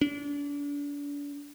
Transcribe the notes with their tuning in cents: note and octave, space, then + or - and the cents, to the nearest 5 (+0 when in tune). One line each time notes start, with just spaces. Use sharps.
D4 -35